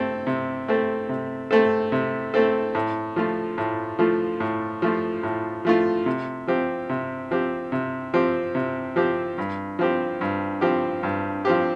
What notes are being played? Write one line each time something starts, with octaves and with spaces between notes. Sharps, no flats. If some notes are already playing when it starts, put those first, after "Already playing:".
Already playing: A3 C4 A4
C3
A3 C4 A4
C3
A3 C4 A4
C3
A3 C4 A4
A2
F3 A3 F4
A2
F3 A3 F4
A2
F3 A3 F4
A2
F3 A3 F4
C3
F3 C4 G4
C3
F3 C4 G4
C3
F3 C4 G4
C3
F3 C4 G4
G2
F3 C4 G4
G2
F3 C4 G4
G2
F3 C4 G4